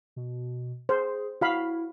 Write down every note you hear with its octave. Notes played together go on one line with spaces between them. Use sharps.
B2
G#4 C5
E4 F#4 F5 B5